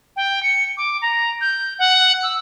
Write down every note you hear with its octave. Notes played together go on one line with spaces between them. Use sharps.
G5
C#7
D6
A#5
G6
F#5
E6